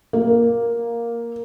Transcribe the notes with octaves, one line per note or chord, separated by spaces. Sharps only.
A#3